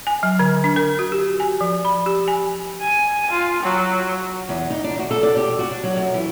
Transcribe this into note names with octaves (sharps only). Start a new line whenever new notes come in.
G#5
F#3
D3
D4
A#4
F#4
G4
G#5
F3
B5
G4
G#5
G#5
F4
F#3
E2
D#4
D4
F#4
A4
D5
G4
F#4
D4
F#3
F#2
E3